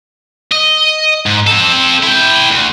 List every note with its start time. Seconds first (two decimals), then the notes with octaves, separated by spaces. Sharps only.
0.52 D#5
1.26 G#2
1.47 C4 A4
2.03 E4 G5
2.50 D2